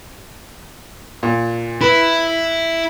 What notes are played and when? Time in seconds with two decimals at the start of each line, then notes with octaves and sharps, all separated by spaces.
1.23 A#2
1.81 E4 B4